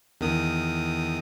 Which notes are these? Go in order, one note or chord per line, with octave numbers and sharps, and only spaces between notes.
E2 D#3 D#6